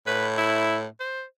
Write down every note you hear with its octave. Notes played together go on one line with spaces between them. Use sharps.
A2 B4
E4
C5